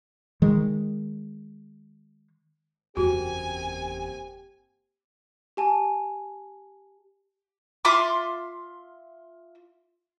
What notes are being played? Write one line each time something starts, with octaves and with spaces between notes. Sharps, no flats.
D#3 G#3
F#1 E2 A#3 C4 F#4 G4 G#5
G4 G#5 A5
F4 E5 C6 D6